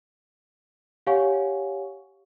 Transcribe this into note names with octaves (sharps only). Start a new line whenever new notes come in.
G4 C#5 F5 F#5 G#5 C#6